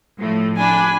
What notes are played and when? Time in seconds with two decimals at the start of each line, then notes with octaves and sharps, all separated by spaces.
0.19 A2 F3 A3
0.58 D4 G#5 B5